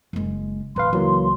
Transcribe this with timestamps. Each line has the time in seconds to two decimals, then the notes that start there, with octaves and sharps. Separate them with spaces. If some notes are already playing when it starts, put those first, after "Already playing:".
0.13 F#1 G#3
0.76 D#1 A1 B4 F5 C6
0.93 C#2 E3 F#3 A#3